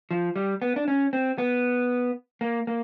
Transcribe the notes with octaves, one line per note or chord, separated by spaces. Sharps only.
F3
G3
B3
D4
C#4
C4
B3
A#3
A#3